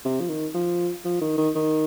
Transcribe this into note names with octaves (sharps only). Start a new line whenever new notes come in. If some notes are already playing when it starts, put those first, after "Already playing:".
C3
F3
D#3
F3
F3
D#3
D#3
D#3